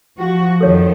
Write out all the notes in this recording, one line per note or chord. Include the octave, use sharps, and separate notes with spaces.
F3 F#4
F2 D#3 F3 A4 C#5